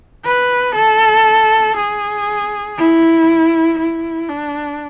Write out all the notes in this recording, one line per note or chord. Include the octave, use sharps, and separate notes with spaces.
B4
A4
G#4
E4
E4
D4